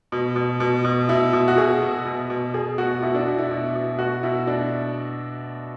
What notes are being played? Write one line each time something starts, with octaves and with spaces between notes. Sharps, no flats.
B2
B2
B2
B2
B2 E4
B2
F#4
B2 G#4
B2
B2
B2
B2 G#4
B2 F#4
B2 E4
D4
B2 E4
E4
B2
B2
B2 F#4
B2 E4
B2 D4